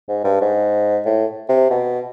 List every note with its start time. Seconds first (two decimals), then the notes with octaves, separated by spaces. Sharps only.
0.08 G#2
0.24 G2
0.41 G#2
1.06 A2
1.49 C3
1.70 B2